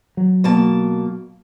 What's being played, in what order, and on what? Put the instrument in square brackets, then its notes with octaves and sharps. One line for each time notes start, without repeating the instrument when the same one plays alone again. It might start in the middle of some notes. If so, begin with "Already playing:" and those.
[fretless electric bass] F#3
[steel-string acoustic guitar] B2 A#3 A5